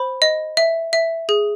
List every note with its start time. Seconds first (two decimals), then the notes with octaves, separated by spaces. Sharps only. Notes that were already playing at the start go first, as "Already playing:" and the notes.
Already playing: C5 B5
0.22 D#5
0.57 E5
0.93 E5
1.29 G#4